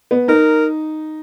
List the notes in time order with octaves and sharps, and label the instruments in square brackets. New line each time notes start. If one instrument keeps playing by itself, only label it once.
[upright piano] B3
[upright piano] D#4 [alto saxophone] A#4